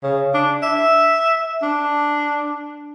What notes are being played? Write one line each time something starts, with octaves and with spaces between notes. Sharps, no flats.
C#3
D4
E5
D4